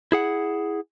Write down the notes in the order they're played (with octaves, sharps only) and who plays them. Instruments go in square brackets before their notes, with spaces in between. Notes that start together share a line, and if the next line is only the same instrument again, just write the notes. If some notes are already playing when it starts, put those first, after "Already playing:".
[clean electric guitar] E4 G#4 F#5